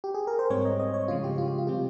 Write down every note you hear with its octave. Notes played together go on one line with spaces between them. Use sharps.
G4
G#4
A#4
C5
G#2 G3 C4 C#5
D#5
D#5
C#5
C#3 F3 G#3 F4
G4
F4
G4
F4
C3 G3 C4 G4